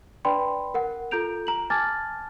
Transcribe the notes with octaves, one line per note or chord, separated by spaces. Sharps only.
D4 B4 D5 G5 B5 C6
A#4 F#5
F4 A4 A#5 G6 D7 F7
A#5 F#7
G#5 A5 D6 F6 G#6 A6